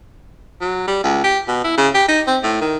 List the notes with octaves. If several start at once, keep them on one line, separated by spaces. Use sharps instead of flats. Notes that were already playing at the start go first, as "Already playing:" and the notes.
F#3
G3
C#2
G4
B2
E4
C#3
G4
D#4
C4
A2
D#3